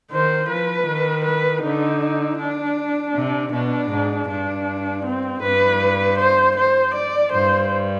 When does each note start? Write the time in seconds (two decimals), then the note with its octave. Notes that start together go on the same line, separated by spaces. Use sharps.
0.11 D#3 C5
0.48 F3 B4
0.86 D#3
1.25 B4
1.62 D3 D#4
2.38 D4
3.14 C3
3.52 B2 D4
3.90 G#2
4.28 G2 D4
5.05 C4
5.42 G2 B4
6.18 C5
6.56 C5
6.94 D5
7.32 G2 C5